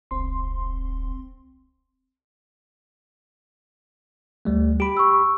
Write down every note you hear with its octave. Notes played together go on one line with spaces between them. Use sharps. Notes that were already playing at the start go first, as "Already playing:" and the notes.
D#1 C2 C4 C6
D2 G3 A3
G4 B5 D7
C#6 E6